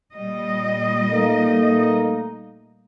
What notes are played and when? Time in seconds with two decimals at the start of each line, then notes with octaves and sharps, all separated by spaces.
0.16 A#2 G3 D#5
1.09 A3 A#3 D#4